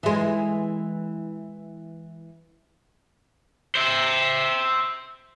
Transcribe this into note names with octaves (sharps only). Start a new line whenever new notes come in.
E3 G#3
C5 E5